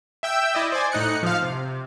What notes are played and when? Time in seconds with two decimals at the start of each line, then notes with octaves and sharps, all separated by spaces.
0.23 E5 G5 E6
0.55 E4 D5 D#5
0.72 C5 D5 G#5
0.92 A2 D#4 F#6 C#7
1.23 F3 F5
1.43 C3